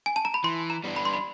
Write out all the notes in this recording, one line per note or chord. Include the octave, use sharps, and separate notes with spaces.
G#5
A5
A#5
B5
E3 C6
A#5
G3 B3 D4
B5
C6
B5